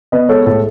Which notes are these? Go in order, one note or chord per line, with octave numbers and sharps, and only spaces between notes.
B3 B4 D#5
G#3 A4 C#5
A2 A4